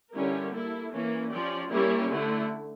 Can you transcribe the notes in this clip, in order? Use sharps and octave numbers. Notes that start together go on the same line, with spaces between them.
D3 G3 C#4 E4 A#4
A#3 E4 A4
E3 A#3 C#4
F3 C#4 G4 D5
G3 A#3 C#4 E4 G4
D3 A3 E4